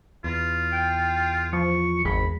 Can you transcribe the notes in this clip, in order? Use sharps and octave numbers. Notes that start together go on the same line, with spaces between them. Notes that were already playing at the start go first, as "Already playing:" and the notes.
E2 E3 F4
G5
F3 C#6
G#1 E2 G#3 B5